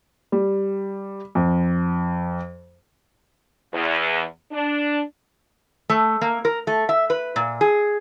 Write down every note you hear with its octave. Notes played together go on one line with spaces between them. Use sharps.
G3
F2
E2
D4
A3
A#3
A#4
A3
E5
B4
A#2
G#4